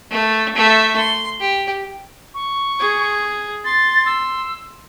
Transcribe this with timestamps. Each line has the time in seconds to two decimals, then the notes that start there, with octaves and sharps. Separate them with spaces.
0.11 A3
0.55 A3 E5
0.98 C6
1.40 G4
2.34 C#6
2.79 G#4
3.65 C6 A6
4.06 E6